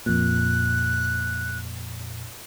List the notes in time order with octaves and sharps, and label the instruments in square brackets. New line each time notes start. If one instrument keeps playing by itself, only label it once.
[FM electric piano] F2 A#2 [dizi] F#6